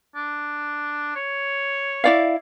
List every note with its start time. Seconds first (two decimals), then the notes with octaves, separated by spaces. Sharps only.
0.15 D4
1.15 C#5
2.04 E4 D5 F5